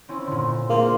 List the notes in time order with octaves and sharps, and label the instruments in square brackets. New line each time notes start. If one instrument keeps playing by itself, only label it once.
[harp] C4 C#4 E4
A#2 D3
[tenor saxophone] A#3 [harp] C4 F4 G#4